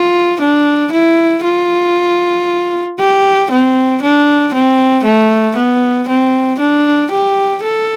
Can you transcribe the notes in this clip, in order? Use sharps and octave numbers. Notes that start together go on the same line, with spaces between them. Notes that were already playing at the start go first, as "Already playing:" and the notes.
Already playing: F4
D4
E4
F4
G4
C4
D4
C4
A3
B3
C4
D4
G4
A4